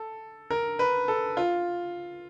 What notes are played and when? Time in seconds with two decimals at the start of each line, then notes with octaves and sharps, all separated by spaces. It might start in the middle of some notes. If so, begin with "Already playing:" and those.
Already playing: A4
0.50 A#4
0.79 B4
1.08 A4
1.37 F4